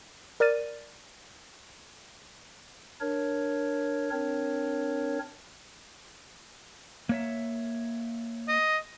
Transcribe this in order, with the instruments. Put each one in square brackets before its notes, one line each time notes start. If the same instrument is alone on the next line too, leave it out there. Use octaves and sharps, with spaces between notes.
[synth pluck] A#4 D5 F6 A6 D#7
[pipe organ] D4 A#4 C#5
C4 D4 A#4 C#5
[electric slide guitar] A#3 C#5 E5
[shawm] D#5